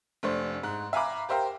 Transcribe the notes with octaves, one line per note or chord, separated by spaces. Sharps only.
F1 A3 D4 C5
G#2 F#6
E5 F5 G#5 A#5 B5 D6
G4 A#4 C5 E5 F5 G5